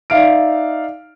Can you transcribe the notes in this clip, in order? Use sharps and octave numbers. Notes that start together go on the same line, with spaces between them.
D#4 D5 E5 F5 F6 D7